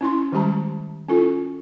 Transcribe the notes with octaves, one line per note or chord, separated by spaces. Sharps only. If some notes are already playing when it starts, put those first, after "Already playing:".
C#4 E4 C6
D#3 G3 G#3 G4 A5 A#5
C#4 E4 F4 A4